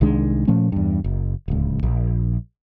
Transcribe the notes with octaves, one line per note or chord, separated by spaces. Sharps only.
C2 D#3 G#3 D4
A#2 F3 A3 C#4
E2 G2
F#1
D1 C#2
A#1